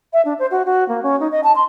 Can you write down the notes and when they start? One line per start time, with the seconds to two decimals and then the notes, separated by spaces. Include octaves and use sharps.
0.13 E5
0.25 D4
0.39 C5
0.51 F#4
0.65 F#4
0.89 A#3
1.03 C#4
1.20 D#4
1.32 D#5
1.44 A5
1.56 C6